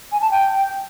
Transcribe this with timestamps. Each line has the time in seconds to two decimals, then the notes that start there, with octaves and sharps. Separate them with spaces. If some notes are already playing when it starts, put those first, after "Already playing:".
0.12 G#5
0.22 A5
0.31 G5